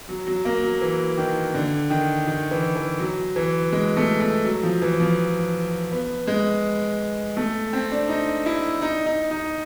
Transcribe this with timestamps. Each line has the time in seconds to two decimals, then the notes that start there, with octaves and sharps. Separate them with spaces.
0.09 F#3
0.27 F#3
0.45 A#3
0.63 F#3
0.81 E3
1.18 D#3
1.54 D3
1.90 D#3
2.27 D#3
2.51 E3
2.75 E3
2.99 F#3
3.36 E3
3.72 G#3
3.97 A3
4.21 A3
4.45 F#3
4.63 F3
4.82 E3
5.00 F3
5.91 B3
6.27 G#3
7.37 A3
7.73 C4
7.91 D4
8.09 D#4
8.46 E4
8.82 D#4
9.06 D#4
9.31 D#4